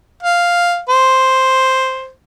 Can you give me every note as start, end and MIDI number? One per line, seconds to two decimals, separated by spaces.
0.23 0.80 77
0.89 2.11 72